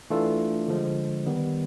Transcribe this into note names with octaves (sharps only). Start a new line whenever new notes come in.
E3 A3 D4 F4 A4
D3 F3 G#3
D#3 G3 B3